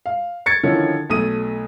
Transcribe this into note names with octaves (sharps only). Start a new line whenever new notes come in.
F5
G#6 A6 C#7
D3 D#3 F3 C#4 E4
B1 A3 D#6 D#7